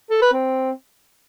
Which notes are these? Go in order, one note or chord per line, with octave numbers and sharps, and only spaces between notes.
A4
B4
C4